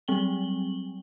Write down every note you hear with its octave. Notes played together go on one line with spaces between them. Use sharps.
F#3 G3 C4 G5 F#7 G7